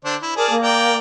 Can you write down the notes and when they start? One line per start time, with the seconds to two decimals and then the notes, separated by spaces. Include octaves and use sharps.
0.05 D3 D4 C5
0.22 E4
0.36 G#4 A#4 D5 A5
0.49 A#3
0.62 D5 G5 A#5